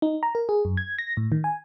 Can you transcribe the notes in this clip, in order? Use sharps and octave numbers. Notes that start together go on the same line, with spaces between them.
D#4
A#5
A#4
G#4
F#2
G#6
A#6
A2
D#3
G#5